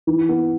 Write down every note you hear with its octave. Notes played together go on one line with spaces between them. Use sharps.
E3
B3